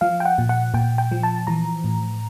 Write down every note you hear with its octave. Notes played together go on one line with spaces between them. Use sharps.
F3 F5
G5
F#5
A#2
F#5
A#2 G5
G5
F3
A5
E3 A#5
A2